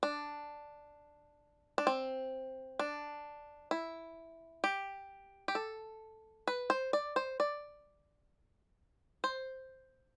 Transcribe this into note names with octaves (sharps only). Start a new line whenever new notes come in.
D4
D4
C4
D4
E4
G4
G4
A4
B4
C5
D5
C5
D5
C5